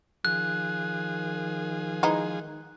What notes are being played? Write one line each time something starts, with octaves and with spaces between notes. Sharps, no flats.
D#3 F3 G#4 F#6
E3 G#3 D#4